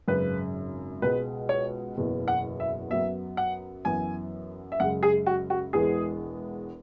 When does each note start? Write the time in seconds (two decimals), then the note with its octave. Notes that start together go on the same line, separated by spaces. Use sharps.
0.08 G#1 F#2 C#3 B4
1.02 C#2 B2 G#3 B3 B4
1.49 C#5
1.96 F#1 E2 B2 B3
2.28 F#5
2.60 E5
2.90 F#2 F#3 B3 E5
3.37 F#5
3.85 F#2 E3 B3 G#5
4.72 E5
4.80 F#2 C#3 G#3 F#5
5.03 G#4
5.27 F#4
5.50 F#4
5.73 E1 E2 E3 G#3 B3 G#4